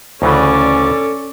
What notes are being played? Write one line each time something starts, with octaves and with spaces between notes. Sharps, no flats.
D2 C#3 E3 C#4 A4 D5